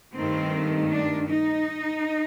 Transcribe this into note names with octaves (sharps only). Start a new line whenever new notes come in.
G2 D#3 A3 C4
D4
D#4